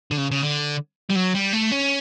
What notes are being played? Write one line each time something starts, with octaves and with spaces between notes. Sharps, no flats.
D3
C#3
C#3
D3
G3
F#3
G3
A3
C#4